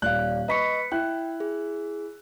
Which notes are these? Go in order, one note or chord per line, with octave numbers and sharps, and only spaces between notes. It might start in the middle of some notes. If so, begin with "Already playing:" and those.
D#1 D5 F5 F#6
B4 D#5 B5 C#6 B6 C#7
E4 G5 F#6
G#4